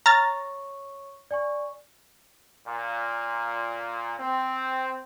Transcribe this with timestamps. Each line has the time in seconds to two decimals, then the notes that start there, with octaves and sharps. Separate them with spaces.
0.06 C#5 A#5 C#6 F6 A6
1.31 D5 G#5 C#6
2.66 A#2
4.19 C4